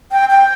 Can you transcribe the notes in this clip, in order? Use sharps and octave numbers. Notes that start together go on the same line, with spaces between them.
G5
G5